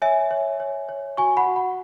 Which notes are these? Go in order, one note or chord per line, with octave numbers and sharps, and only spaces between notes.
C#5 E5 G#5
C#5
C#5
C#5
F#4 G#5 C#6
F#5 B5
F#4
F#5 B5